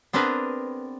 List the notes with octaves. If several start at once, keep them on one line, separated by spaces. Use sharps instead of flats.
B3 C4 D4 G#4 A#4 B4